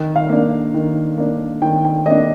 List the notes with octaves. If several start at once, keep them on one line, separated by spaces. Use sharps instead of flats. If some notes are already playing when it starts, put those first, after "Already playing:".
Already playing: D#3
F5
A#3 D4
D#3
A#3 D4
D#3 G5
G5
A#3 D4 D#5